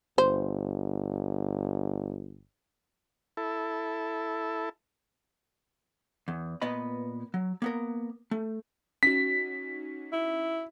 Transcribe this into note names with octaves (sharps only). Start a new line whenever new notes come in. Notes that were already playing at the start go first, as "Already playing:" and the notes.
G1 C5
E4 A4
E2
A#2 B3 B4 D#5 B5
F#3
A#3 B3 A#4
A3
C#4 D#4 F#4 B6
E4